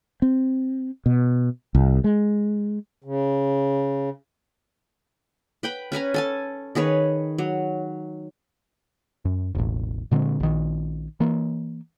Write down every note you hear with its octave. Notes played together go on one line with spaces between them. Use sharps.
C4
B2
C2
G#3
C#3
B4 G5 B5
C#4 B4 G#5 A#5
A4 G#5 A5
D#3 G#4 B4 C#5
F#3
F#2
E1 A1
A#2 D3 G#3 C4
A#1 D#3
E3 A#3